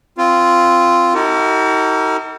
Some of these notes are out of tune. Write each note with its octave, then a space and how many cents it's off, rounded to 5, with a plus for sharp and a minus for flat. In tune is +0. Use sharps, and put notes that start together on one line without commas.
C4 +0 F4 -10
D#4 +35 F#4 +40 A#4 -45